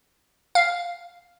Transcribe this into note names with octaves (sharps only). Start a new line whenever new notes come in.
F5